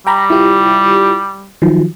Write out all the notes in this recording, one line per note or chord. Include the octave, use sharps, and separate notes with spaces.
G3 G5 A#5 B5
E4 F4 G4
D#3 F3 F#3